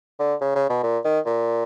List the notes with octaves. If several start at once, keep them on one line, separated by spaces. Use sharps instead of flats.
D3
C#3
C#3
B2
A#2
D#3
A#2